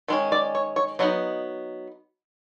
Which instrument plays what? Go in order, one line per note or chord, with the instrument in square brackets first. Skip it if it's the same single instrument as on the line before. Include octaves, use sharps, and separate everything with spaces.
[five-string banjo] D#3 G#3 C#4
D5
C#5
C#5
F#3 B3 D#4 D#5